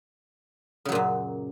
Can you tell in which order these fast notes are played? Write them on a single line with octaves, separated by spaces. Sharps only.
C#3 F#3 A#2 F#2